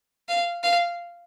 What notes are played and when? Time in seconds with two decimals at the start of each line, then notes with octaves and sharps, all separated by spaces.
0.28 F5
0.63 F5